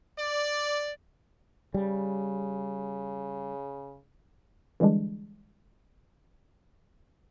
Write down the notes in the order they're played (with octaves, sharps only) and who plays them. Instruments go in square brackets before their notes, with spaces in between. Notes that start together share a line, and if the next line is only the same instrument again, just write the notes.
[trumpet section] D5
[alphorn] C#3 [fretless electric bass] G3
[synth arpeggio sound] D3 E3 G3 G#3 D4